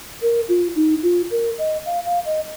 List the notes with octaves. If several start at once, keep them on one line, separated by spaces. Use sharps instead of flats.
A#4
F4
D#4
F4
A#4
D#5
F5
F5
D#5